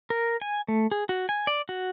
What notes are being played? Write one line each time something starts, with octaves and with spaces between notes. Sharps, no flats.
A#4
G#5
A3
G#4
F#4
G#5
D5
F#4